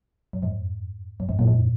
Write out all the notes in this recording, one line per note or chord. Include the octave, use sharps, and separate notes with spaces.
F#2
F2 G#2
F#2
F2 G#2
F#2 A#2
F2 G#2